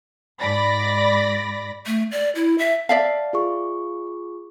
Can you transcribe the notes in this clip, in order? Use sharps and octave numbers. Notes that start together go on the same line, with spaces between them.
G#2 D5 B5 A#6
A3
D5
E4
E5
D5 E5 F5 A5
F4 G#4 C#6